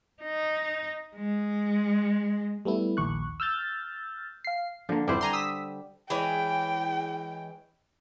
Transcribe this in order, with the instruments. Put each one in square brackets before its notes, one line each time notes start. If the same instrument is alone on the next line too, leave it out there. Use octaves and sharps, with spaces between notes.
[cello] D#4
G#3
[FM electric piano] G3 A3 B3 E4
A#1 D#2 C#6 F#6
E6 F6 G6 A6
F5 C7
[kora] D3 [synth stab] F3 A#3
[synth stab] G#1 F2 E4 [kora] G3 C5
[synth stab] G#5 A#5 C6
D#6 E6 B6
[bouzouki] E3 G#3 C#5 [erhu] G5